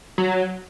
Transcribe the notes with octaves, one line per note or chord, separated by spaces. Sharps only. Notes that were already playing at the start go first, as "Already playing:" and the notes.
F#3